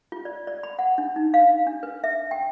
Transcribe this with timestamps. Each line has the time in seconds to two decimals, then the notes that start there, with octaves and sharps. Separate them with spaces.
0.12 F4
0.25 D5
0.47 D5
0.63 B5
0.79 F#5
0.98 D4
1.16 D#4
1.34 F5
1.67 D4
1.83 B4
2.04 E5
2.31 G5